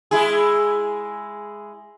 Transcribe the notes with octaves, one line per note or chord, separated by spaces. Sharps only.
G#3 E4 G#4